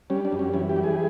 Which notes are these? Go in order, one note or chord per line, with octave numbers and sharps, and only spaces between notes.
G3 C#4
D4
F#2
C#4
E3 C#4
G4
G3
G#4